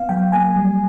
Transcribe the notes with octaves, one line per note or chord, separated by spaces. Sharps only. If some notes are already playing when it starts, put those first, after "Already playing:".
Already playing: B3 F5
F#3 G5
A#3 G#5
G3